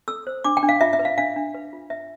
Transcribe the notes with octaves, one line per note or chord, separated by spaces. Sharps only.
A4 E6
C5
D4 D6
G5
D4
F5
F4 E5
E5
B4
F5
D4 F5
D4
B4
F4
B4 E5